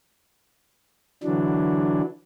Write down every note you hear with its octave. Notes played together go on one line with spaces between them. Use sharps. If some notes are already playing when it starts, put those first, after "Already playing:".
D3 E3 F#3 D4